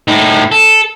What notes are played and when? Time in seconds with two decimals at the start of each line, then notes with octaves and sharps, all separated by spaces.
0.08 A2 D#4
0.52 A4